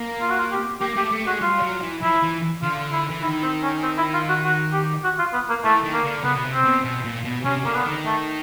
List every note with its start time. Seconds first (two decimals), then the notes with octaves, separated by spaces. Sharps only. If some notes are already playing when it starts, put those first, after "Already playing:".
Already playing: A#3
0.21 F4
0.30 F#4
0.38 F4
0.52 G4
0.81 A#3 G4
0.96 A3 G4
1.12 A3
1.27 G#3 F#4
1.42 G3 F4
1.62 F#3
1.82 E3
2.02 F3 E4
2.23 E3
2.63 D3 F4
2.92 E4
3.10 E3
3.22 D#3 E4
3.42 C4
3.63 C#4
3.83 C4
3.98 E4
4.13 F4
4.29 F#4
4.43 F#4
4.73 G4
5.04 F#4
5.19 F4
5.33 B3
5.49 A#3
5.64 E3 A3
5.84 D#3
5.94 A#3
6.04 D3
6.24 C#3 B3
6.35 B2
6.44 C3
6.54 C4
6.64 B2
6.84 B2
7.05 A#2
7.24 B2
7.45 C3 C#4
7.65 D3 A#3
7.74 B3
7.85 D#3
8.06 A3